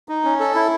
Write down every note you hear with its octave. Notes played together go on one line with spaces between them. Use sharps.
D#4
C#4
A4
E4